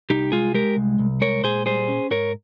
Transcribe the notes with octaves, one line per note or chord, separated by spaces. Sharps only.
C2 D#4 G4
G#3 F4 G#4
G#3 G4 A#4
C2
C2
G#3 A#4 C#5
A#2 G#4 C5
G3 G#4 C5
C#4
G#2 A#4 C#5